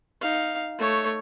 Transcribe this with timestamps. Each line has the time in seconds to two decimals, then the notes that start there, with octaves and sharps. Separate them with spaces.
0.21 D#4 F5
0.78 A3 C#5